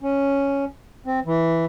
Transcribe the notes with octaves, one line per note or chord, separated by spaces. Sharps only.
C#4
C4
E3